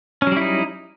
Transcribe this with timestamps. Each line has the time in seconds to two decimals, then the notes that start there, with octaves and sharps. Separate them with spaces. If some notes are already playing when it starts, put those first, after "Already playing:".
0.22 C#4
0.27 F#3
0.32 G3
0.37 E4
0.41 D#4